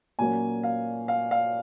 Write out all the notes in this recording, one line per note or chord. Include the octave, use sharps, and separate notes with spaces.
A#2 F#3 A#3 C#4 G#5
F5
F5
F5